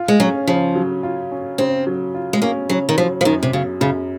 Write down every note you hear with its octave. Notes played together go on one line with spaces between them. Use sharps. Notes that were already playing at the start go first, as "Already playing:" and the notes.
Already playing: F4
G#3
F#3 C#4
C#3 F3
F#3
F4
C#4
C#3 C4
F#3
F4
G#3
A#3 C#4
C#3 F#3
D#3
F3 F#3
F3
F#2 D#3
C3
C#3 F#3
F#2 C#3